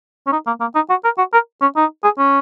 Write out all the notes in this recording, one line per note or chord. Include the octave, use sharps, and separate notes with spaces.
C#4
D#4
A#3
A#3
D#4
F#4
A#4
F#4
A#4
C#4
D#4
G#4
C#4